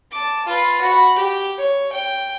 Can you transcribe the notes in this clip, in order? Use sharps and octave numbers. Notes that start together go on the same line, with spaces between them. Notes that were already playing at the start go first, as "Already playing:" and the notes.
A5 D6
F4 B4
F#4 B5
G4
C#5
G5